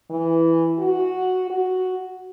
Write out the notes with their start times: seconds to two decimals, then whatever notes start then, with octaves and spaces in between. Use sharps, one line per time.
0.10 E3
0.79 F#4
1.50 F#4